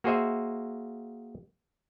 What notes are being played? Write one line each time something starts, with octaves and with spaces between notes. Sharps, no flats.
A#3 F#4 G#4 C5 D#5 E5